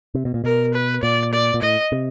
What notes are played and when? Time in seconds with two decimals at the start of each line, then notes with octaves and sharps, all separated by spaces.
0.15 C3
0.25 B2
0.34 A#2
0.44 B2 A#4
0.74 B4
1.03 A#2 D5
1.33 D5
1.54 A#2
1.62 A2 D#5
1.92 C3